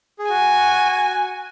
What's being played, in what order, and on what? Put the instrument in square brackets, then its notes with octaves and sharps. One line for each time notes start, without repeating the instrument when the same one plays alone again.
[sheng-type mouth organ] G#4
[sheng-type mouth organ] F#4 [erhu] G#5